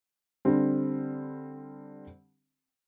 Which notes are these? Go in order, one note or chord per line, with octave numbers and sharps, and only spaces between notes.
D3 G3 C4